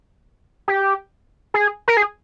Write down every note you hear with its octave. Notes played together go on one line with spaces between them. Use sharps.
G4
G#4
A#4
G#4